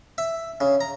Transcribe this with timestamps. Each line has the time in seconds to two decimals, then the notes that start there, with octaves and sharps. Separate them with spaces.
0.18 E5
0.61 C#3
0.81 A#5